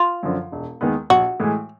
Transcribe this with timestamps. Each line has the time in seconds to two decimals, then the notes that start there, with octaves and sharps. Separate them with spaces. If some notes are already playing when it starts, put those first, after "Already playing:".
Already playing: F4
0.23 F#2 D3 F3
0.52 E1
0.81 D#2 D#3 G#3 B3
1.10 A#1 F#4
1.40 A2 E3 G#3